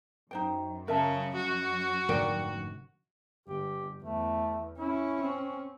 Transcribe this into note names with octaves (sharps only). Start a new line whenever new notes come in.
F#2 D#4 C5 G5
C#3 A#4 E5 A5
F#4
F1 G#2 D3 A#4 D5 G5
G1 G4
E2 A3
C#4 E4
C4